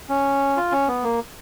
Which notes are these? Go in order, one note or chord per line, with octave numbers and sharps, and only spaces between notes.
C#4
F4
C#4
B3
A#3